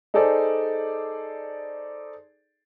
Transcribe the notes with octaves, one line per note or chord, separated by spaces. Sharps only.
D#4 G#4 A4 C5 D5